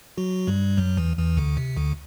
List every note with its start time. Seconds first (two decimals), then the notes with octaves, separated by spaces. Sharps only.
0.18 F#3 F#4
0.47 G2 G3
0.77 F#2 F#3
0.97 E2 E3
1.17 E2 E3
1.37 D2 D3
1.57 C3
1.77 D2 D3